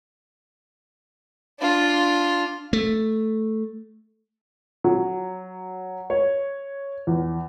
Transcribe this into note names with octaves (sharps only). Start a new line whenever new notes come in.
D4 F4
A3
F#3
C#5
E2